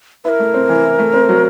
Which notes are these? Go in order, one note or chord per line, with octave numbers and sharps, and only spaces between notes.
E4 A#4 B4
A3
C4
E3
E4
A3
C4
F#3